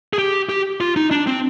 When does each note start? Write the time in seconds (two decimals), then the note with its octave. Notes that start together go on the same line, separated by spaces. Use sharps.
0.13 G#4
0.18 G4
0.49 G4
0.81 F4
0.96 D#4
1.11 D4
1.27 C4